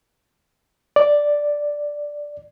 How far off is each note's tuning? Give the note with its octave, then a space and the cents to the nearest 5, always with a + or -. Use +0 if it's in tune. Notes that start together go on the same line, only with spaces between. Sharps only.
D5 +0